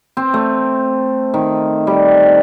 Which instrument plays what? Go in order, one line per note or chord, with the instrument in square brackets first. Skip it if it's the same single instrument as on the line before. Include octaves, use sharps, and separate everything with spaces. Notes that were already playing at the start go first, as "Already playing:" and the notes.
[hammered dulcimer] C4
A3
D#3
G3